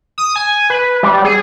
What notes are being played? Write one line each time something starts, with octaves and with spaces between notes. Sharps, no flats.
D#6
G#5
B4
G3
G#4